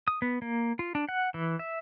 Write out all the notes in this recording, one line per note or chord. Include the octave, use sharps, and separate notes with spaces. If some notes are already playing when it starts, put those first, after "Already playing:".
D#6
B3
A#3
F4
D4
F#5
E3
E5